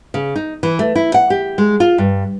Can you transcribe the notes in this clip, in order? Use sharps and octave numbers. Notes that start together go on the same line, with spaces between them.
C#3
D#4
E3
A3
E4
F#5
G4
G#3
F4
G2